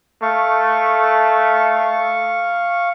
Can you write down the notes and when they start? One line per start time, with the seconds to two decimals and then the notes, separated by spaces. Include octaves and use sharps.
0.22 A3 F5 C#6